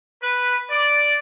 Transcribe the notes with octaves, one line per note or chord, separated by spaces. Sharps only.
B4
D5